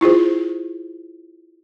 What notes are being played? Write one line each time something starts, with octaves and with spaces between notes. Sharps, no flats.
E4 F4 G#4 C5